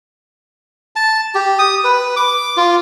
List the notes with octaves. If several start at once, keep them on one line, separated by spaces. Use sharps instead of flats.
A5
G4
D#6
B4
D6
F4